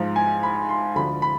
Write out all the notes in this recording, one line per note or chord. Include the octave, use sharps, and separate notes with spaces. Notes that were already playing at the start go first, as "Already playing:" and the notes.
Already playing: G#2 F3
G#5
B5
C6
D2 D3 F3 B5
B5